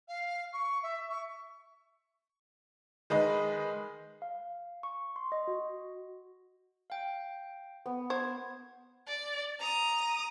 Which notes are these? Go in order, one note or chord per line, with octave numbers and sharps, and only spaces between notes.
F5
C#6
E5
C#6
D#3 G#3 B4 D#5
F5
C#6
C6
D#5
F#4
F5 G5
B3
C5 G#6
D5
A#5 D#6